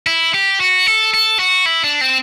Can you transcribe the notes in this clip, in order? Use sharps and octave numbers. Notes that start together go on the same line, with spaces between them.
E4
G4
F#4
A4
A4
F#4
E4
D4
C4